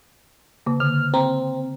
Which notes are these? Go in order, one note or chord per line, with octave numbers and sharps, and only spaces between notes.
C#3 A#3
D3 F6
C4 A#5